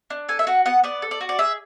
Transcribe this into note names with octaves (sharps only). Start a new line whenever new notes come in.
D4
A4 G#5
E5
F#4 F#5
B3 F#5
B3 D5
A4
D5
F#4
D5
G#4 E5